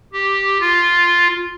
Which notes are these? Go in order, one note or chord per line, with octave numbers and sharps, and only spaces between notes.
G4
F4